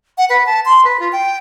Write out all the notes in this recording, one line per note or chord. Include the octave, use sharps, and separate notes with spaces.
F#5
B4
A5
C6
B4
F4
G5